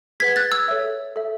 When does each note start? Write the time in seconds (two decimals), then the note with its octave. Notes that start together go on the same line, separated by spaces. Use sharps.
0.20 G#4 B4 F#5 G#6 B6
0.36 F#6 A6
0.52 E6 G#6
0.68 A4 C#5 E5
1.16 A4 E5